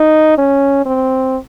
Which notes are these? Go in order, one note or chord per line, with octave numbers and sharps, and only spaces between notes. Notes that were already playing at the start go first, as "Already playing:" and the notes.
Already playing: D#4
C#4
C4